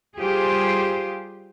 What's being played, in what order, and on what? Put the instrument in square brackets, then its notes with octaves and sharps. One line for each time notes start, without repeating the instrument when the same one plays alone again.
[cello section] G3 F4 G4 G#4 C5